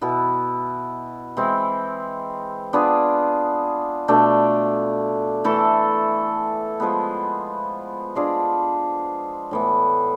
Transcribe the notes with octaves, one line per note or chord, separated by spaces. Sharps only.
B2 B3 E4
E3 G#3 C4 E4
B3 D4 F4 G#4
B2 A3 D4
E3 A3 E4 A4
F3 G#3 B3
G#3 D4 F4 G#4
A2 E3 B3